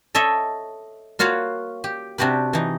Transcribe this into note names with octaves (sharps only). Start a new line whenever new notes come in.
A4 C#5 D#5 E5
A#3 F4 F#4 C#5 F5
G4
C3 D4 F#4 G4 B4
E3 D#4